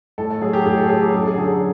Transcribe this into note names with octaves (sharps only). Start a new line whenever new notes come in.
A2 A4
A4
F#3 G#4
G4
A2 G#4
A4
F#3 G#4
G4
F#2 G#4
A4
G#4
D3 F#3
G#4